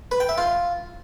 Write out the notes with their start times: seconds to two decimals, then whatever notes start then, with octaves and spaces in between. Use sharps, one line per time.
0.11 B4
0.20 G5
0.29 E5
0.38 F4